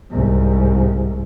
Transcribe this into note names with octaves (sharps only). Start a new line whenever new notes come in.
C2 G#2